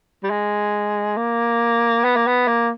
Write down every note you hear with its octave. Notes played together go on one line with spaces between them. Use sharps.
G3
G#3
A#3
B3
A#3
B3
A#3